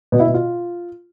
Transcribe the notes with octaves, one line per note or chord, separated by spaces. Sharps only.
B2
E4
B2
F4